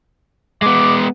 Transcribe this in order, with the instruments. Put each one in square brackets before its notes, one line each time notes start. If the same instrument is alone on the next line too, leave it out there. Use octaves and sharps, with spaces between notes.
[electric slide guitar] G#3 B3 [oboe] D6